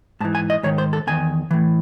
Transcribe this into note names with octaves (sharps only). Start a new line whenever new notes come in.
G#2 E3 A5
G#5
D#5
G#2 D#3 C#5
C5
A4
E2 D#3 G#5
A2 E3